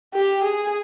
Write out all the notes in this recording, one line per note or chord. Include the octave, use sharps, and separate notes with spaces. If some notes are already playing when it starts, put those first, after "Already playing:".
G4
G#4